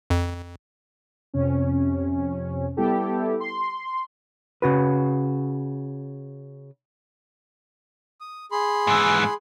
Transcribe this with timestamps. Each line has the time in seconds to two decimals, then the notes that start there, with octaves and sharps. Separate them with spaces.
0.10 F2
1.34 F2 C3 C#4
2.77 G3 B3 E4 G4 A4
3.40 C6
4.62 C#3 F#4 B4
8.21 D#6
8.52 G#4 B5 C6
8.87 G#2 E3